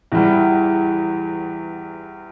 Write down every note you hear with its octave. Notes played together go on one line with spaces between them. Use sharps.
E2 E3 G3